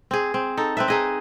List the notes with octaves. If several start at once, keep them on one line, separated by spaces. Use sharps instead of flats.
C4 G#4
C4
D#4 A4
C4 B4 E5
D#4 G#4 D#5